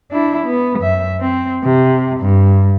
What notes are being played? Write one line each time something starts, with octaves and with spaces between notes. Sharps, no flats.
D4 E4
B3
F#2 E5
C4
C3
G2